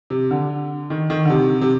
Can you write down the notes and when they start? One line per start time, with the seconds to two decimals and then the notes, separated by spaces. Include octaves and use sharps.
0.10 C3
0.31 D3
0.90 D#3
1.10 D#3
1.25 D3
1.30 C3
1.61 C3